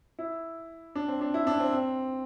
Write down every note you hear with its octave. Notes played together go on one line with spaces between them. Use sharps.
E4
D4
C4
D4
E4
D4
C4
C4